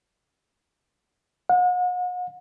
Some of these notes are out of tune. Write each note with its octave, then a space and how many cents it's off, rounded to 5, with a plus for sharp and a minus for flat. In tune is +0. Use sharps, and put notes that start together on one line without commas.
F#5 -40